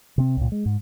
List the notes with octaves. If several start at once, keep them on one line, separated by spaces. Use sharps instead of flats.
C3 C4
C#2 A#2
G#3
G#2